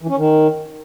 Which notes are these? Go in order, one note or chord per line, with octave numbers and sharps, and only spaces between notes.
E3
C#4
D#3